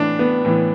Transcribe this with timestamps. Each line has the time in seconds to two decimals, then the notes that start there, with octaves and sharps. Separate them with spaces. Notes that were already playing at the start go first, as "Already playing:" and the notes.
Already playing: A2 E3 D4
0.19 B3
0.45 A2 E3